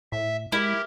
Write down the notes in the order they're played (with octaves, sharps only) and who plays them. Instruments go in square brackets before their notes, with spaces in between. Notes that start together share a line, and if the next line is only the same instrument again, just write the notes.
[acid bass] A2 [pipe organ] E5
[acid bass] G#3 [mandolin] E4 [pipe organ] G4 A#4